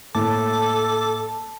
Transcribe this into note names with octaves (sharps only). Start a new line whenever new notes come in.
A2 A#3 A4 A5 D6